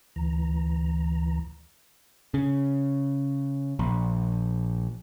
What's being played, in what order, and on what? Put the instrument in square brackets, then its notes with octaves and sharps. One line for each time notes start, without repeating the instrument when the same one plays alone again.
[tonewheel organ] D2 E3 A#5
[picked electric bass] C#3
A#1